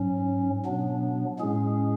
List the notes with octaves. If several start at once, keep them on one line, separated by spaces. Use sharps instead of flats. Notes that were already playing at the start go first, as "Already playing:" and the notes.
Already playing: G#2 F#3 C#4
B2 F#3 B3 D4
A2 G#3 C#4 G#4